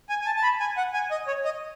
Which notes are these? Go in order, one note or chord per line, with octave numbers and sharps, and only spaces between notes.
G#5
G#5
A5
A5
B5
G#5
F#5
G#5
D#5
C#5
D#5